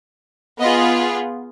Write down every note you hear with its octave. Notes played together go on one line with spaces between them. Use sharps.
B3 F4 G#4 D#5